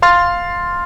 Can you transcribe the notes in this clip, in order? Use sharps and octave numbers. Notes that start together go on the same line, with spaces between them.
F5 C6 F6 A6